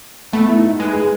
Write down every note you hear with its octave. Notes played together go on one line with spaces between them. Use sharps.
A3 B3
E4
D#4
G#3 B4
G#4